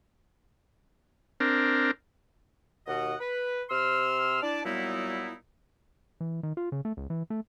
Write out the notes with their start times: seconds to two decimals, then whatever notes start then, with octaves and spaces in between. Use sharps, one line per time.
1.40 C4 D4 A#4
2.87 D#2 B2 D#5 F#5
3.20 B4
3.70 C3 C6 E6 F6
4.42 D4 E4 D5 A5
4.64 A#2 F#3 G3 B3 D#4 E4
6.20 E3
6.43 D#3
6.57 F4
6.72 C#3
6.85 A3
6.97 C#2
7.10 E3
7.30 A3